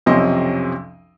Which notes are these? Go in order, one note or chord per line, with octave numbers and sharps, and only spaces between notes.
B1 F2 C3 C#4 D#5 C6